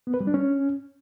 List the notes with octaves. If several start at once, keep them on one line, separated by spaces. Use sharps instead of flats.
B3
B4
G3
D4
C#4